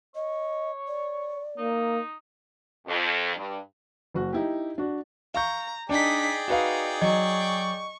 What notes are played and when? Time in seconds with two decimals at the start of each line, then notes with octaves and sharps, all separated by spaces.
0.15 C#5 D#5
0.87 D5
1.58 A#3 D#4
2.87 F2
3.36 G2
4.14 F#1 F#4
4.33 D#4 E4 G4
4.78 D4 F#4
5.34 F5 A#5 C#6 G6
5.89 D4 D#4 G#4 D5 G5 B6
6.48 D#4 F#4 B4 F5
7.01 F#3 D#5 C#6